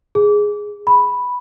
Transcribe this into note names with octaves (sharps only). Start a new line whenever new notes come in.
G#4
B5